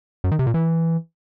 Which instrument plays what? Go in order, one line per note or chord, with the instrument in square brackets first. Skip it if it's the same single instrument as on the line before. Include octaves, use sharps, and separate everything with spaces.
[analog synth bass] F#2
D#3
C3
A#2
E3